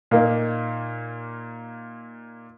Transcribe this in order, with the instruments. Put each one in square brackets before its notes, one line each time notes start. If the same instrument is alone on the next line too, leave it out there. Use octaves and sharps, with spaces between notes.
[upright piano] A#2 A#3 D#4